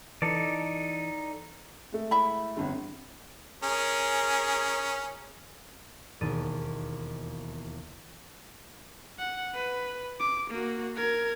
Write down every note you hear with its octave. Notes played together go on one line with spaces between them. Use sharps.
E3 D#4 A4 D5
G#3 A3
E4 E5 B5
G1 F2 D3
C#4 G#4 A#4
E1 D#2 A6 D#7
F#5
B4
D6
A#3 F#4
A#4 G#6